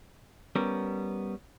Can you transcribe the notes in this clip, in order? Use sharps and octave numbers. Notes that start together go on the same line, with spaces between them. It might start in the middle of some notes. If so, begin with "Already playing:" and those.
G3 B3 C#4 A#4